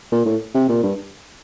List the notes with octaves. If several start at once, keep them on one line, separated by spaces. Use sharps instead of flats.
A#2
A2
C3
A#2
G2